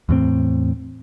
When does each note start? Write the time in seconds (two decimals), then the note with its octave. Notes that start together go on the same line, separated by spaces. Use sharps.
0.09 E2 A2 C4